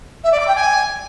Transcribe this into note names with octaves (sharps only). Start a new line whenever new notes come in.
E5
D5
D6
G5
G#5